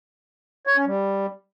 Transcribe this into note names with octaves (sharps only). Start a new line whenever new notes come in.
C#5
C#4
G3